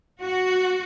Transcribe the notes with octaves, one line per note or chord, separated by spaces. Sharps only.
F#4